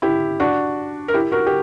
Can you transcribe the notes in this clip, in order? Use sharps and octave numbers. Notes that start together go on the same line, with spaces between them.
E4 G4
D4 F#4
A#4
E4 G4
F#4 A#4
G4